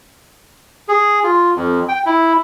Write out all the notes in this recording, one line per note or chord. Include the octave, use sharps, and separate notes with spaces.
G#4
F4
F2
G5
E4